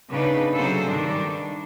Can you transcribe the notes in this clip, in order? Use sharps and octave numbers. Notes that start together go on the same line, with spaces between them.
C#3 B3 D4 D#4 B4
C3 F#3 A#3 G#4 A4 C5
G2 D#3 G3 D4